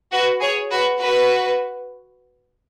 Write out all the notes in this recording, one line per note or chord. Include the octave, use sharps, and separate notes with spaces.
F#4 B4
G#4 C#5
F#4 B4
F#4 B4